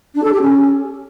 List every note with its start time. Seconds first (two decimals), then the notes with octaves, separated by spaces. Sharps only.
0.15 D4
0.24 A4
0.32 G4
0.41 C#4